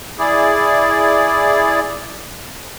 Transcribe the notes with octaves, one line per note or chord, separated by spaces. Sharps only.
E4 G#4 D5